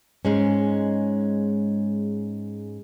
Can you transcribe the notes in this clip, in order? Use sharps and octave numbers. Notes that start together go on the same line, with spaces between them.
G#2 G#3 C#4